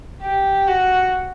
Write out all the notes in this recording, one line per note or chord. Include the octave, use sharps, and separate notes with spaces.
G4
F#4